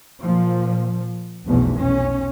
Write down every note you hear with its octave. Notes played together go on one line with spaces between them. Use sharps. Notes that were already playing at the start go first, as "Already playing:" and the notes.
A#2 F3
F1 B1 E2 B2
B1 C#4